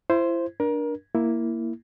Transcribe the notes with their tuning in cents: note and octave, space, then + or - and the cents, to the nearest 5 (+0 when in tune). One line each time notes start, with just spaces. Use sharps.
E4 +30 C5 +0
D4 +0 A#4 +25
A#3 +0 E4 +0